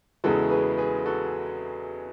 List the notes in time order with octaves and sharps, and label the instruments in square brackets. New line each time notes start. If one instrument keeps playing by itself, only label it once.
[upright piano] E2 C#3 E3 G#3 F#4 A4
G#4 B4
G#4 B4
F#4 A4